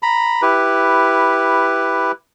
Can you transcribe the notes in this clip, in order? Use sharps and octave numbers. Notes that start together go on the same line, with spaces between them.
A#5 B5
E4 G4 B4